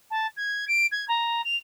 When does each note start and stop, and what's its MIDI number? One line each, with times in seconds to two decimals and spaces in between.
0.10 0.27 81
0.36 0.65 92
0.68 0.86 98
0.91 1.05 92
1.08 1.44 82
1.44 1.56 101